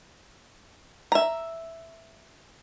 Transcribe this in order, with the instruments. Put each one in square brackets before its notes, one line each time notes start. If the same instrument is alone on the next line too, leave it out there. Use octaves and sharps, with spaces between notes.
[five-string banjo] E5 A#5